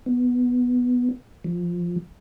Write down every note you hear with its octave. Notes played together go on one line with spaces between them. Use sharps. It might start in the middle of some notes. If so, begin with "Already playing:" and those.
B3
F3